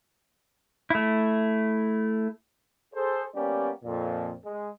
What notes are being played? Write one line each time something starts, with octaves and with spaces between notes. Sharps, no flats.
A3 E4
G#4 A4 C5
G3 A#3 B3 C#4 G4 D5
F2 A#2
G#3